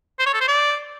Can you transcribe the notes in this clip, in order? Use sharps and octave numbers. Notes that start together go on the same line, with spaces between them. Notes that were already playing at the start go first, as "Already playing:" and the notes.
C5
C#5
A4
C5
D5